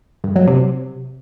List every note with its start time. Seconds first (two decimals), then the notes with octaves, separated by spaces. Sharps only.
0.24 G2
0.36 F#3
0.47 C3